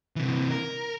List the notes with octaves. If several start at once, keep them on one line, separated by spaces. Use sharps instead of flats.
C3 E3
A#4